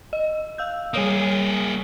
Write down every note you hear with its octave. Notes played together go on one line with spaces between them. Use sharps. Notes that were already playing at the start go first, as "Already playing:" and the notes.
D#5
F5 E6 G6
G3 A#3 G#4 C#5 D#6